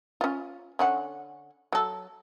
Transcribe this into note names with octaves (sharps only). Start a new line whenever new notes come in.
C#4 F4
D3 C#4 F#5
F#3 A4